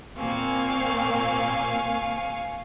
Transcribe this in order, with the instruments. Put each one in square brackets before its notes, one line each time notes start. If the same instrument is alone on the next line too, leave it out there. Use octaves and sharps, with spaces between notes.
[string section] A#2 A#3 C4 [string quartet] F5 G#5 C#6